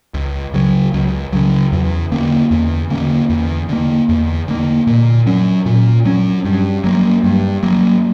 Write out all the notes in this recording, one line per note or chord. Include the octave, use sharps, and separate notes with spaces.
C#2
C#3 F#3
C#2
C#3 F#3
E2
D3 A#3 C#4
E2
D3 A#3 C#4
E2
D3 A#3
E2
D3 A#3
A#2
F#3 C#4
A#2
F#3 C#4
G2
F#3 A#3
G2
F#3 A#3